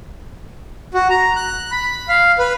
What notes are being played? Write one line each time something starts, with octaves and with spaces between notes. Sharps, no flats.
F#4
A#5
F#6
B5
F5
B4